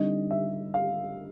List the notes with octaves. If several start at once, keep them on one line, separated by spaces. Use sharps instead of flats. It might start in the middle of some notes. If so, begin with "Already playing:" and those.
Already playing: D3 G3 C4 D#4 D#5
E5
F5